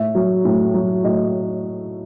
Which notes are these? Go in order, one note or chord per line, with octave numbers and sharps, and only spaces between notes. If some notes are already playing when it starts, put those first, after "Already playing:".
Already playing: A2 E5
F#3
A2
F#3
A2 D#5